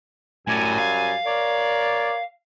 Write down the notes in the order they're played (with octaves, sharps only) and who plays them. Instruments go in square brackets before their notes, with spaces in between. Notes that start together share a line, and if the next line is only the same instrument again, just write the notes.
[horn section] F#2 G3 G#5 [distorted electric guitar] A2
[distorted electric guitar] F5
[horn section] A#4 C#5 D5